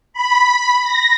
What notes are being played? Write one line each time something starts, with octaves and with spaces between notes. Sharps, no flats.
B5
A#6